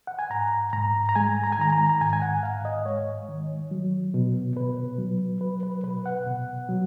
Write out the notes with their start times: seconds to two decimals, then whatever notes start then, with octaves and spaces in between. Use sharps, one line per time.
0.07 F#5
0.19 G#5
0.30 G#2 A#5
0.73 G#2 A#5
1.09 A#5
1.15 G#3 G#5
1.43 A#5
1.52 G#5
1.58 D#3 A#5
1.72 A#5
1.89 A#5
2.01 G#2 G#5
2.13 G#5
2.22 F#5
2.43 G#2 F5
2.65 D#5
2.85 G#3 C#5
3.28 D#3
3.71 F#3
4.14 B2
4.56 B2 B4
4.98 F#3
5.41 F#3 B4
5.63 B4
5.84 B2 B4
6.06 F#5
6.26 B2
6.69 F#3